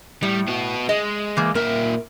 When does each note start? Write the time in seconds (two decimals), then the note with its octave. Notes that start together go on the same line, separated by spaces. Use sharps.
0.23 A2 G3
0.48 B3 F#4
0.89 G#3 D#5
1.37 E3 A#3
1.55 A#2 A#4 E5